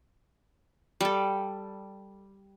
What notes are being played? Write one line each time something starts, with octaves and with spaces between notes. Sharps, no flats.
G3 A4